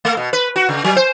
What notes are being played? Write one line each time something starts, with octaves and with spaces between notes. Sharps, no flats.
A3
B2
B4
F#4
C#3
F#3
C5